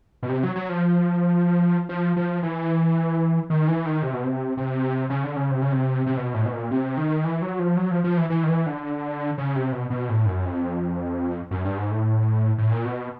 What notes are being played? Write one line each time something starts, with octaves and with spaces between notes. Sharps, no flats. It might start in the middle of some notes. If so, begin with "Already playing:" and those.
B2
C3
F#3
F#3
F3
F3
F3
E3
D#3
E3
D#3
C3
B2
C3
C3
C#3
D3
C#3
C3
C#3
C3
C3
B2
A2
B2
A#2
C3
D#3
E3
F#3
F3
F#3
F3
F3
E3
E3
D#3
E3
D3
C#3
C3
B2
B2
A2
F#2
F2
F#2
G2
G#2
A2
A2
A#2
B2